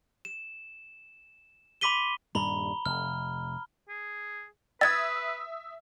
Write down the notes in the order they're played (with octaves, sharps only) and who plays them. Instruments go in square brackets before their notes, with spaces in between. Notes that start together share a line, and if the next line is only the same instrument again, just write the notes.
[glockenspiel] E7
B5 C6 D6 B6 D#7 G7
[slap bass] D#1 G2 G3 [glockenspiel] A#5 B5 G7
[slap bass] F1 [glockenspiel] F6
[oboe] G#4
[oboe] B4 [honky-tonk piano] E5 D#6 [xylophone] G#6 A6